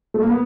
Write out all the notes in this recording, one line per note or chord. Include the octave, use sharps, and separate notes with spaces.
A3
A#3
B3